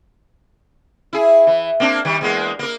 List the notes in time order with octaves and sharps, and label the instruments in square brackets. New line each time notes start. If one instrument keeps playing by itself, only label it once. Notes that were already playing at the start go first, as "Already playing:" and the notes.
[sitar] E4 G#4
E3
A#3 C4 D4
D#3 G3
E2 G#3 A#3
A#3 A#4